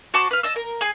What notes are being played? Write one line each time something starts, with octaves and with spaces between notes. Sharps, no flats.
F#4 C5 A5 D6
B4 F5
D#5 A5 E6
A#4
G#4 G#5